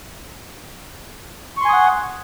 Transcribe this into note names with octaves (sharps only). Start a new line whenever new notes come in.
F#5 G#5 C6 C#6 D#6